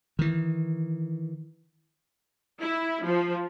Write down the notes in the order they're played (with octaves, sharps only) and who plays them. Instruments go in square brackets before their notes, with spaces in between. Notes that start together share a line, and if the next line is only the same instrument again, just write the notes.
[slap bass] D#3 E3
[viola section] E4
F3